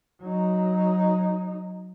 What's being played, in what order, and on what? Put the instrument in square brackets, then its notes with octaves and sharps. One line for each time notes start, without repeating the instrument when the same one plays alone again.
[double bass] F#3 D#4